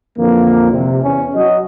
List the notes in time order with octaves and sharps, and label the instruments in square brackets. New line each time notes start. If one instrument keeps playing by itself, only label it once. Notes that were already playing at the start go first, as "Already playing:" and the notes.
[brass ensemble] F2 D3 E3 F3 A#3
C3
E2 C#4
F#3 F#4 D#5